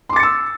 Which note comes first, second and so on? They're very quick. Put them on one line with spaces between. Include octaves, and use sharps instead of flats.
C6 D6 A6 C#7 E6